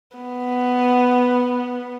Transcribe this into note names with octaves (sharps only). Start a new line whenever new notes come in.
B3